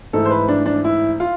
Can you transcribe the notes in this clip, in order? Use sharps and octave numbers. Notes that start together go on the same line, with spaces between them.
G#2 E3 A3 A4
C5
B4
D4
D4
E4
F4